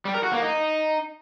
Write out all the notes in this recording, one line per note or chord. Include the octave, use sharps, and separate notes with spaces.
G3
A#4
F#4
A#3
D#4